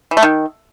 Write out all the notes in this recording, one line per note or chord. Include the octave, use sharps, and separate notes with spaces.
E3
A3
D#3